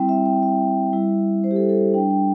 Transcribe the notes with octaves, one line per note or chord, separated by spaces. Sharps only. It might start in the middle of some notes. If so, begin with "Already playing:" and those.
Already playing: G3 C4 E4 G5
E5
G5
E5
G3 E4
C5
G4
A4
A4
G3 D4 G5
G5